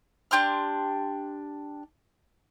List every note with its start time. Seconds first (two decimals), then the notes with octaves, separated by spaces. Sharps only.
0.31 D4 G4 C6 F6